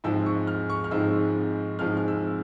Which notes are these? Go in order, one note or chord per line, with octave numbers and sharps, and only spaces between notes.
G#2 F3 G#3 C4 E6
C#6
F6
C#6
F6
G#2 F3 G#3 C4 E6
G#2 F3 G#3 C4 F6
F6
E6